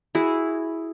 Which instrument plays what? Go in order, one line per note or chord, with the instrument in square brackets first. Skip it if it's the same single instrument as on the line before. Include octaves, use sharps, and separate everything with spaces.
[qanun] E4 F#4 G#4